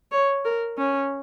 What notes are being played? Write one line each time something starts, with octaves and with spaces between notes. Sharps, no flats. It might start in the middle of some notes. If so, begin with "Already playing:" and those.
C#5
A#4
C#4